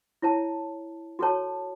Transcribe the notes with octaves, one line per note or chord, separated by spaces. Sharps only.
E4 C#5 A5
F#4 A4 C#5 A5